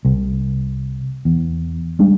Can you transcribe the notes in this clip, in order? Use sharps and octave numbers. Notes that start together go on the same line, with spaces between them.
C2
E2
G3 G#3 D4